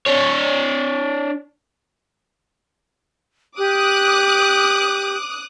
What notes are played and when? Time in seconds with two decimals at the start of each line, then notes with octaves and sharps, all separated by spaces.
0.07 D4 C#5
3.58 G4 D6 D#6 F#6